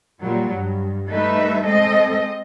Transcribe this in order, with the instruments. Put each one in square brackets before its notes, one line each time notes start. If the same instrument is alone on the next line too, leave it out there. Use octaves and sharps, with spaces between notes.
[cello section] A#2 F#3 G3
G2
G3 A3 D#4 B4 E5
G#3 C4 A4 D#5